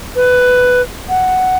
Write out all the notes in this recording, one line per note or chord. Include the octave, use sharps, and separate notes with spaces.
B4
F#5